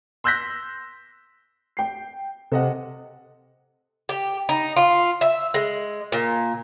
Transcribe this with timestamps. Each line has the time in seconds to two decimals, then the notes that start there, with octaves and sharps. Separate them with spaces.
0.24 C6 E6 F#6 G6 A#6 B6
1.77 G5 C7
2.52 C3 A4 D#5 F#5
4.09 G4
4.49 D#4
4.76 F4
5.21 E5
5.54 G#3
6.12 A#2